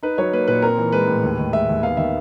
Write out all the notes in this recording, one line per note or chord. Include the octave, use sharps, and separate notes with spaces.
D#4 B4
F#3 C#5
A#3 B4
A#2 B4
C4 A#4
E3
G#3 B4
A2
D#2
D#3
G#3 E5
D#2
B3 F5
D#3 E5